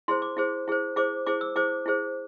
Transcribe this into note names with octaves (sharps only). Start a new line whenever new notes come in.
E4 G#4 C5 C6
D6
E4 G#4 C5
E4 G#4 C5
E4 G#4 C5 D6
E4 G#4 C5 D6
E6
E4 G#4 C5 D6
E4 G#4 C5